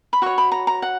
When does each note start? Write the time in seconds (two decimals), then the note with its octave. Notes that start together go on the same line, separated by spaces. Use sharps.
0.13 B5
0.22 F#4 C#5 C#6
0.38 B5
0.52 A#5
0.67 A#5
0.82 F#5